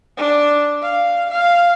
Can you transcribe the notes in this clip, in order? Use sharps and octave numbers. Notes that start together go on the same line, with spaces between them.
D4
F5
F5